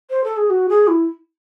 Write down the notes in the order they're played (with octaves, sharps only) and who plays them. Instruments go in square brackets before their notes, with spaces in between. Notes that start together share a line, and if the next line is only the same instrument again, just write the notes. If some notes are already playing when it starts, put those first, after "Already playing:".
[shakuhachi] C5
A4
G#4
F#4
G#4
E4